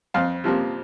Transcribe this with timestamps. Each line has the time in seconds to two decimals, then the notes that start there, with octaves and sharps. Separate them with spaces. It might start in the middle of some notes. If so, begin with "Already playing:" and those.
0.14 F2 F5
0.44 C3 F3 A#3